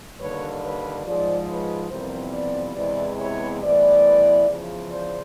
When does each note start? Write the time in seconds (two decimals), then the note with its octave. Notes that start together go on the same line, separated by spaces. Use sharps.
0.19 D#2 D3 G3 B4 C#5
0.62 B4 C#5
1.05 G#2 F3 G#3 C5 D5
1.48 B4 C#5
1.90 F2 C3 E3 G3 B3 A#4 C5
2.34 C5 D5
2.76 E2 C3 E3 G#3 B3 C5 D5
3.19 B4 C#5
3.62 A2 E3 G3 B3 C5 D5
4.48 E2 C#3 F3
4.90 C5 D5